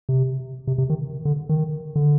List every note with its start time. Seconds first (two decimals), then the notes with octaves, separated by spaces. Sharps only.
0.09 C3
0.67 C3
0.78 C3
0.90 D#3
1.25 D3
1.49 D#3
1.96 D3